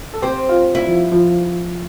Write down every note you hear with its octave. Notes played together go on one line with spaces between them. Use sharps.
A4
C4 G4
F4
E4
F3
F3